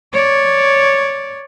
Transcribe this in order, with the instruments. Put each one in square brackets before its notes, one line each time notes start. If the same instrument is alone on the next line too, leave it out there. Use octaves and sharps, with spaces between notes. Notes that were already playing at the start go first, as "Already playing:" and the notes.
[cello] C#5 D5